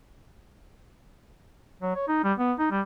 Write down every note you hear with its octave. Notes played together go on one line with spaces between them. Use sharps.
F#3
C#5
D#4
G3
B3
D#4
G3